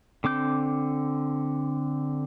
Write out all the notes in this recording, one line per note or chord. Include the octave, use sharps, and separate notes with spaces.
D3 C4 D6 G6